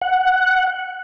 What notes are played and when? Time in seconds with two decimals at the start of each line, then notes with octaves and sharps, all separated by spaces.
0.01 F#5